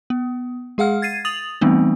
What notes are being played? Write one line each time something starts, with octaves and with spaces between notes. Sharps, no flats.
B3
G#3 G#4 F5 F#5 F6
G#6 A6 C7 D#7
D#6 A6 F7 F#7
E3 G3 A3 B3 C4 D#4